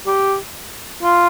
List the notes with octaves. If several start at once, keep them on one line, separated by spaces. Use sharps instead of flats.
G4
F4